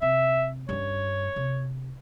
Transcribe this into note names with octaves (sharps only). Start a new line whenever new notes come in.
C3 E5
G2 C#4 C#5
C3